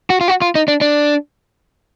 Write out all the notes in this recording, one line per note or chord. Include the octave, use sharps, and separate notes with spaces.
F#4
F4
F#4
F4
D#4
D4
D4